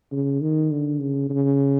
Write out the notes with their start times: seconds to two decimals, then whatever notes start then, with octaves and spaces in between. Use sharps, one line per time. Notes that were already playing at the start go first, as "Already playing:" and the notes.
0.12 C#3
0.41 D#3
0.71 D3
1.00 C#3
1.30 C#3